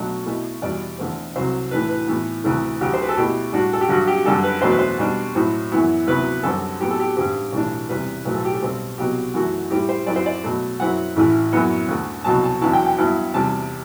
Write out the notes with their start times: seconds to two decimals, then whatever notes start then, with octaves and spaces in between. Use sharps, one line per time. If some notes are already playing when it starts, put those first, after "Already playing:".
Already playing: B1 B2 F#3 A3 D4
0.26 B2 A3 E4
0.62 E2 B2 G3 D5
0.98 E2 D3 A3 C4
1.36 C2 C3 F#3 C5
1.71 A2 E3 A3 D4 B4
1.89 B4
2.08 A2 E3 B3
2.44 D2 C3 E3 A3
2.81 D2 D3 F#3 G4
2.94 C5
3.01 B4
3.09 A4
3.17 B2 A3 E4 G4
3.53 A2 G3 D4 F#4
3.73 A4
3.81 G4
3.89 G2 D3 F#3 F#4
4.08 G4
4.26 F#2 D3 G3 D4 A4
4.44 B4
4.62 E2 B2 F#3 A3 D4 C5
4.71 B4
4.79 C5
4.98 B2 G3 D4
5.35 A2 F#3 C4 E4
5.72 F#2 E3 B3 E4
6.07 D2 C3 F#3 B3 E4 B4
6.43 F#2 D3 G3 C4 A4
6.80 A2 F#3 B3 G4
6.91 A4
7.00 G4
7.17 A1 G2 D3 G3 C4 G4
7.52 B1 A2 E3 A3 D4
7.89 E2 C3 G3 B4
8.25 B1 A2 F#3 A3 C4 B4
8.35 A4
8.45 G4
8.54 A4
8.62 B1 B2 G3 C4
8.98 C2 B2 F#3 B3 G4
9.34 F#2 E3 A3 E4 F#4
9.71 A2 G3 C4 E4 G4
9.89 C5
10.07 F#2 F#3 C4 E4 D5
10.16 C5
10.26 D5
10.44 B2 F#3 A3
10.80 F#2 F#3 C4 E4 F#5
11.16 A1 A2 E3 A3 E4
11.52 F#2 F#3 B3 E4
11.88 D2 D3 A3
12.24 C2 B2 F#3 A5
12.44 A5
12.61 E2 D3 F#3 B3 E4 A5
12.73 G5
12.86 G5
12.98 G2 F#3 B3 E4 A5
13.34 E2 C3 G3 A5